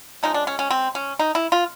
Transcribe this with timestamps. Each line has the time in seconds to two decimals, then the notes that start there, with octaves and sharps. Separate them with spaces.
0.23 C#3 F3 G#3 D#4
0.34 D4
0.47 C#4
0.59 C#4
0.70 C4
0.95 C#4
1.19 D#4
1.35 E4
1.52 F4